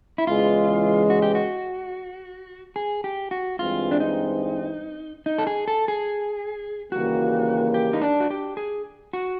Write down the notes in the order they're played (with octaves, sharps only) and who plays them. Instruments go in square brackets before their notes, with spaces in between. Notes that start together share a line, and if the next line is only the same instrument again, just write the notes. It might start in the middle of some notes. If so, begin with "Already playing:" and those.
[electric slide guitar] E4
[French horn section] E2 C#3 E3 G#3 [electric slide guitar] F4
[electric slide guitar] F#4
G4
F#4
G#4
G4
F#4
[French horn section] G2 E3 G#3 C4 [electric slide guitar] F4
[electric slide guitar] D4
D#4
D#4
A4
G#4
A4
G#4
[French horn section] D#2 C#3 E3 G3 A#3 [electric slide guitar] F#4
[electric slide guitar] G4
D#4
D4
F#4
G4
G#4
F#4